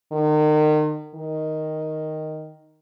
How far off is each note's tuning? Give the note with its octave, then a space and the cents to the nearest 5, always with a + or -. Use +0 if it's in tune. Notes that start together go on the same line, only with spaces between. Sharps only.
D#3 -35
D#3 +0